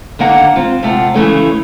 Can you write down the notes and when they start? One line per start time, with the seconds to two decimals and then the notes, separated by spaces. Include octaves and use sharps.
0.19 D#2 D3 A#3 F#5 A#5
0.56 C4 F4
0.83 C3 A3 F4 F#5
1.14 C#3 E3 A3 C#4